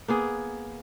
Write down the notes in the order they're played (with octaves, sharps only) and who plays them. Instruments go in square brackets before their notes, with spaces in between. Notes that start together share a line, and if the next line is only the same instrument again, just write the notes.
[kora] A#3 B3 G#4